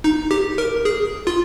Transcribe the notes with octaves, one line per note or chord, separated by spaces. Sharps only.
D#4
G4
A#4
G#4
F4